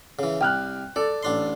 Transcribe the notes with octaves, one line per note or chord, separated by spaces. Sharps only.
C#3 E3
C2 G5 F6 F#6
A4 D5
A1 D4 C6